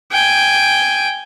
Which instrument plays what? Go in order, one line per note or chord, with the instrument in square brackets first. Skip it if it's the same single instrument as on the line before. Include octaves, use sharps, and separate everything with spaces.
[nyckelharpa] G5 G#5